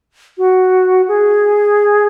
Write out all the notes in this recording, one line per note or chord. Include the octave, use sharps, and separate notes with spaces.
F#4
G#4